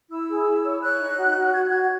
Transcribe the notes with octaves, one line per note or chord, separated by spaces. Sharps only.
E4 E6
G#4
E4
C#5
C#5 F#6
D#4
F#4
F#4
F#4 G#6
F#4 G#6